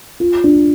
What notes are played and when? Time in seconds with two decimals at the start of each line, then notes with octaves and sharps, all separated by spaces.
0.20 F4
0.44 D4